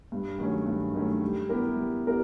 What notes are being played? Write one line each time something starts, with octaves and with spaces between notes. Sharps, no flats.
G2
D#3 F#3 A3 C#4
G2
D#3 F#3 A3 C#4
G3
B3 E4 G4 A#4
G3
B3 E4 G4 A#4